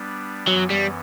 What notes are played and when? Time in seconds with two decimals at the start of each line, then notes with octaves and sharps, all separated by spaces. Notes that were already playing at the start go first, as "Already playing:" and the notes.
Already playing: G3 B3 D4
0.47 F#2 E3 F#3 B3
0.70 G3